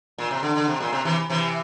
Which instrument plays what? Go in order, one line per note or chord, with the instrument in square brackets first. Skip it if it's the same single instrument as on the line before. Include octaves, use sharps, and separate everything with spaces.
[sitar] A#2
C3
D3
D3
C3
A#2
C3
C3 E3
C3 E3